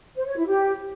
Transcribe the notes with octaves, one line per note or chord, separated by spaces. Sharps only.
C5
C#5
E4
G4